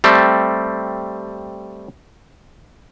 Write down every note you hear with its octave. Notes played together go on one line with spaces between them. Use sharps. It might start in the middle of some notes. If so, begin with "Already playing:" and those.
G3 A3 C4